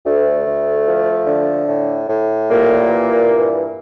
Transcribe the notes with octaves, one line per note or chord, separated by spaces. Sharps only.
D2 A3
D2
F3
D3
A2
A2
A#2 G3 A#3
E3
G2